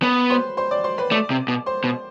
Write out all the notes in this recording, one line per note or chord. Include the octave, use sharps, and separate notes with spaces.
B3 B4 B5
C5 C6
C5 C6
D5 D6
C5 C6
B4 B5
A3 D5 D6
C3
B2
C5 C6
B2